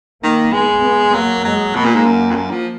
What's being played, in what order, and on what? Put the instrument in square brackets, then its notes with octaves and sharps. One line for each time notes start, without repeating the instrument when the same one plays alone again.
[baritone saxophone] D#3 [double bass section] A#3
[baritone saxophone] G#3 [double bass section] B3
[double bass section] B3
[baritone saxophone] F#3 [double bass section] A#3
[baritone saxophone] F#3 [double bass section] G#3
[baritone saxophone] B2 [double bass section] A#3
[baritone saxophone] A#2
G#2
F#2
F2
F#2
F3